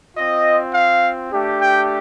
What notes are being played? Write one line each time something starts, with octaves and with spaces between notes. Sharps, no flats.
C4 F4 D#5
F5
A3 D4 G4
G5